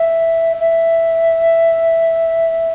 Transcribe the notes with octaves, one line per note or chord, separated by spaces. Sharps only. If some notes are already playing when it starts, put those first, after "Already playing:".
Already playing: E5
E5